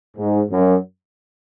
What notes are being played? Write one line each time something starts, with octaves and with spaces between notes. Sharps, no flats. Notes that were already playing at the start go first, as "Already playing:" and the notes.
G#2
F#2